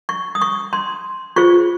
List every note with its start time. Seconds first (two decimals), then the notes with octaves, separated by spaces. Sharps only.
0.09 C#6
0.35 D#6
0.42 C#6
0.73 C6
1.36 F4 G#4 C5 C#6